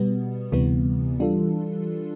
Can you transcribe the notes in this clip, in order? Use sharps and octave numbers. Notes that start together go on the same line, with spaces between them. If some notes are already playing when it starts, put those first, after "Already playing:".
Already playing: B2 G3 B3
D2 C3 E3 G3 B3
E3 G3 D4 F4 A4